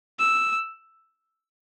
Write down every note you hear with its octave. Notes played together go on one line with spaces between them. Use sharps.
E6